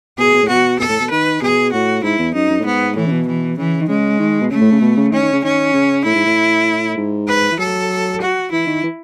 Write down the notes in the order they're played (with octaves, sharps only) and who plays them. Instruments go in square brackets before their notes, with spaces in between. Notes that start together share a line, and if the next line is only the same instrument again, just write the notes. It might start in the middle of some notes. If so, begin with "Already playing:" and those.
[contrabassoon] B2 [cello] G#4
[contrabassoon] B2
A2
[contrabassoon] B2 [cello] F#4
[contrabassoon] B2 [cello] A4
[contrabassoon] A2
B2
[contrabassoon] D#3 [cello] B4
[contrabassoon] B2 [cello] G#4
[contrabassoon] A2 [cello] F#4
[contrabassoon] G#2 [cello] E4
[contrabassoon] E2
[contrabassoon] F#2 [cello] D#4
[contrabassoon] F#2
A2
[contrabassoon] G#2 [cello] B3
[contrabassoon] A2 [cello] E3
[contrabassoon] C#3
B2
[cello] E3
[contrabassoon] C#3 [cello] E3
[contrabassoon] D#3
[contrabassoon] C#3 [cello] G#3
[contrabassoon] D#3
B2
[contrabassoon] C#3 [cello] A3
[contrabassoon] A2
C#3
B2
C#3
[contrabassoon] D#3 [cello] C#4
[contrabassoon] D#3
C#3
[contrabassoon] D#3 [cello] C#4
[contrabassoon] C#3
[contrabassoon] A2 [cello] E4
[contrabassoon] G#2
A2
G#2
[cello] B4
[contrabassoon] E3
[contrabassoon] F#3 [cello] A4
[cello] F#4
[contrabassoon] E3 [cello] E4
[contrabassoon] D#3
E3